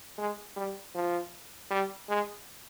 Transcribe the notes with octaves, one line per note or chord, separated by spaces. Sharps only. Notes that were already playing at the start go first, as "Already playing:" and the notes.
G#3
G3
F3
G3
G#3